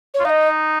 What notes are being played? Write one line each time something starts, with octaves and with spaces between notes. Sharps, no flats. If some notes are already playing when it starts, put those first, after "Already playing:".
C#5
F4
D#4 D#5 F5